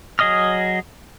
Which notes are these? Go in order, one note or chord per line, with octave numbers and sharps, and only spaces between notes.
F#3 G#4 D#5 D#6 F6